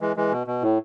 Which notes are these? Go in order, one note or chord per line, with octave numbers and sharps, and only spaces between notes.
E3 G#3
E3 G#3
B2
B2
A2